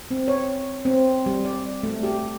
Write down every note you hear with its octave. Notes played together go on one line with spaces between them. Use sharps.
C4
C#5
C4
G3
D5
A3
G4